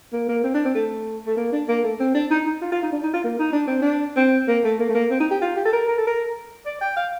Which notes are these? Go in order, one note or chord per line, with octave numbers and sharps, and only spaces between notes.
A#3
A#3
C4
D4
C4
A3
A3
A#3
D4
A#3
A3
C4
D4
D#4
D#4
F4
F4
D#4
D4
D#4
F4
A#3
D#4
D4
C4
D4
C4
A#3
A3
A#3
A3
A#3
C4
D#4
G4
F4
G4
A4
A#4
A#4
A4
A#4
D5
G5
F5